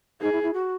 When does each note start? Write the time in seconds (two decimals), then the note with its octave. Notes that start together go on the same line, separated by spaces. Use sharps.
0.21 D#4 G#4
0.32 E4
0.43 E4
0.54 F#4